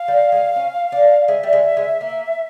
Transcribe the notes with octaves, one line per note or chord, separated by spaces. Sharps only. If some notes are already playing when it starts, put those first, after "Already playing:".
Already playing: F5
G3
G#3
C#4
D4
G#3 E5
G3
G#3
G#3
A#3